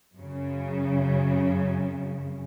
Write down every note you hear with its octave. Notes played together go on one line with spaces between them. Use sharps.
F#2 C#3